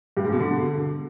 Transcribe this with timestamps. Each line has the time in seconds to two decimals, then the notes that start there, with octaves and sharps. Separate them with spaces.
0.17 G2
0.24 G#2
0.32 B2
0.40 D3